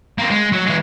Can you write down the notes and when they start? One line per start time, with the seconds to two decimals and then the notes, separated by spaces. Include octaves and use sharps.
0.18 A#3 C4
0.30 G#3
0.52 F#3
0.66 E3 G#3